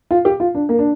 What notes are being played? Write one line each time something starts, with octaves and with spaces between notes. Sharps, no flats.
F4
G4
F4
D4
A#3
D4